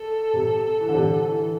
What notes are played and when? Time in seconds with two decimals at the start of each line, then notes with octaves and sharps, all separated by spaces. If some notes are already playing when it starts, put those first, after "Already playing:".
Already playing: A4
0.34 C3
0.81 E3
0.88 D3
0.95 C3
1.02 D3
1.29 E3